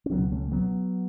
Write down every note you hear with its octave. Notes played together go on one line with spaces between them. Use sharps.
C#4
C#2 B2 F#3 B3
A3 C#4
F#3 B3